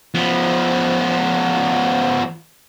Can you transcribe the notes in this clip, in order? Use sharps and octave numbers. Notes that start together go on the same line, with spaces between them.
F3 B3